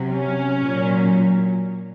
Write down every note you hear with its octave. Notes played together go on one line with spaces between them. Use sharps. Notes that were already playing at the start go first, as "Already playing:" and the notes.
Already playing: C3 F#3
C#4
A#2 F#3